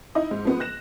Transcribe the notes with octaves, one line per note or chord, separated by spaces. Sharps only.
D#4 E4 D#5
G#2
F3 G#3 A#3 B3
F#6 A#6 E7